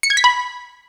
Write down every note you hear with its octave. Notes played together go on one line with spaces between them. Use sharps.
C#7
G#6
B6
B5